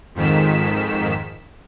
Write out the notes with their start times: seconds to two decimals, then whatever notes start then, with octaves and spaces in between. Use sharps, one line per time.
0.15 F2 G#2 D#3 B6 E7